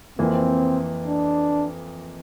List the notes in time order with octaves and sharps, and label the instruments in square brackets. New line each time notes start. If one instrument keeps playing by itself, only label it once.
[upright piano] F2 E3 A#3 [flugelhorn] C4
[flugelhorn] D4